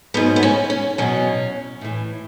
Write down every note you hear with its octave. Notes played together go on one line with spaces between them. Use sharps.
G#2 F#3 B3
B3
C#4
C#4
E2 B2 F#3 C#4
A2 E3